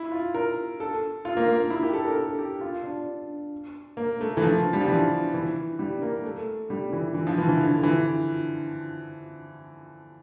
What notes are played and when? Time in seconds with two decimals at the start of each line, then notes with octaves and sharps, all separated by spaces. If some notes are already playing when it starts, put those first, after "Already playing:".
Already playing: E4
0.12 F4
0.34 A#4
0.80 A4
1.25 F4
1.37 A#3
1.48 A#3
1.70 E4
1.83 G4
1.94 A4
2.05 A#4
2.16 A4
2.39 G4
2.61 F4
2.84 D4
3.97 A#3
4.21 A3
4.37 E3
4.42 F3
4.73 G3
4.81 F3
4.88 E3
5.34 E3
5.79 G3
6.02 A#3
6.24 A3
6.70 G3
6.93 E3
7.14 E3
7.27 F3
7.38 E3
7.49 E3
7.61 D3
7.83 E3